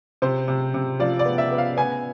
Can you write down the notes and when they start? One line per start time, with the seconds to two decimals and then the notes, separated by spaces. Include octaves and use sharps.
0.22 C3 C5
0.48 C3
0.74 C3
0.99 F3 D5
1.19 D5
1.25 B3
1.38 E5
1.51 B3
1.58 F5
1.77 B3 G#5